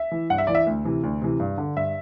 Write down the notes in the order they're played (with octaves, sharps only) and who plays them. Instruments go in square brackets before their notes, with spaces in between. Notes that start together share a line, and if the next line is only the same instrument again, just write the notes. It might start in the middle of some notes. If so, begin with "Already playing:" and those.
Already playing: [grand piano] E5
E3
G2 F#5
E5
E3 D5
E5
D2
C3 E3
D2
C3 E3
G2
D3
G2 E5